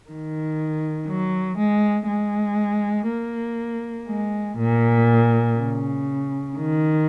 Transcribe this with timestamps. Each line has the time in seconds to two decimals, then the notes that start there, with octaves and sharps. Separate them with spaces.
0.08 D#3
1.08 F#3
1.58 G#3
2.07 G#3
3.08 A#3
4.07 G#3
4.58 A#2
5.57 C#3
6.57 D#3